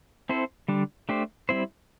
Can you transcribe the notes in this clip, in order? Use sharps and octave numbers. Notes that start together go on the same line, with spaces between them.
C4 E4 A4 C5
D3 G3 D4
A3 D4 G4 C5
G3 C4 E4 C5